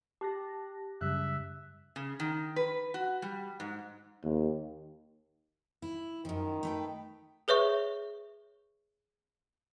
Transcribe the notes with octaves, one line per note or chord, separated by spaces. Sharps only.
G4 A5 F#6 A#6
F#2 C#3 G3 E5 F#6
C#3
D#3
B4
F#4
G3
G#2
D#2
E4
F#2 D#3 F3
A3 B4 G5
G#4 B4 C#5 E5 C#6